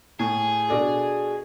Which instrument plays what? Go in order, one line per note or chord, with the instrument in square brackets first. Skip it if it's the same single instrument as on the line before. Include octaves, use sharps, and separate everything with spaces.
[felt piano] A2 [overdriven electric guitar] G#4
[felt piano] B2 D4 A4